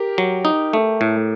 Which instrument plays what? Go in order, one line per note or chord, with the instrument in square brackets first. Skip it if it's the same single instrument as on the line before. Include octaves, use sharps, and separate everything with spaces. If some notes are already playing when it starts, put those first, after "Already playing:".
Already playing: [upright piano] G4 A#4
[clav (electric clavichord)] F#3
D#4
A3
A2